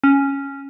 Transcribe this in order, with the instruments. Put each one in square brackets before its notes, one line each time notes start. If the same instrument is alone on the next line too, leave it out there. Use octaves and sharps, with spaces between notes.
[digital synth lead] C#4